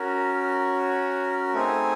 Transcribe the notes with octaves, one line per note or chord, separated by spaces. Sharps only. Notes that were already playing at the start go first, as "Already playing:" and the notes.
Already playing: C#4 F#4 A#4
A3 C4 D#4 G#4